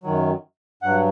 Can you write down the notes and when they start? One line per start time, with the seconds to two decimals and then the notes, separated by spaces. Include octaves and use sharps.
0.03 F#2 D#3 F#3
0.82 G2 F#3 F#5